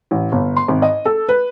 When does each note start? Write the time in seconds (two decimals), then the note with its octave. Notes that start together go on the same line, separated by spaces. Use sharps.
0.11 A1
0.32 G1
0.57 C6
0.68 G#1
0.82 D#5
1.05 A4
1.29 B4